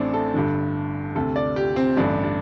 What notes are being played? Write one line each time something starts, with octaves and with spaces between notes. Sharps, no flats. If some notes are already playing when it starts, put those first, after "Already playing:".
Already playing: A1 A2 C4 D4
A4
G1 G2 D3
D2 C3 A4
D5
G4
C4
A1 G2 D3 D4
D4